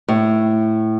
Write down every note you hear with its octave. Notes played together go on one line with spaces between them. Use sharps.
A2